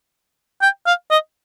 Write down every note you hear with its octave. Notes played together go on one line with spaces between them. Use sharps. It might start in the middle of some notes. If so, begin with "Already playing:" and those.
G5
F5
D#5